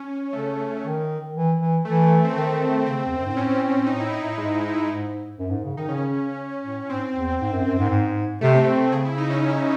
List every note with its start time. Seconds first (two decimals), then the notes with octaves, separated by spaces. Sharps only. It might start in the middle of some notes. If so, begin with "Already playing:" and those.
Already playing: C#4
0.33 C#3 A3
0.84 D#3
1.35 E3
1.60 E3
1.85 E3 A3
2.24 C4
2.35 D#3 A3
2.86 C#3 C4
3.06 E2
3.15 F#2
3.26 G#2 C4
3.36 A2 C#4
3.86 A2 D#4
4.00 E4
4.12 D#4
4.37 G#2 G#3
4.88 G#2
5.39 F#2
5.50 G#2
5.64 C#3
5.77 D#3 D#4
5.89 C#3 C#4
6.64 A2
6.89 G#2 C4
7.15 E2
7.41 G#2
7.52 F#2
7.65 F#2
7.78 G#2
7.90 G#2
8.41 C3 A3
8.54 C4
8.69 A3
8.92 C#3 G#4
9.05 E4
9.17 D#4
9.30 C#4